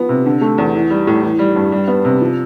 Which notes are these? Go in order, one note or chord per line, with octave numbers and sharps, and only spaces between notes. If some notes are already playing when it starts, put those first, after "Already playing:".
Already playing: F3 B3
C3
D3
A3
E2
E3
G3
A2
E3
G3
G2
G3
B3
C3
F3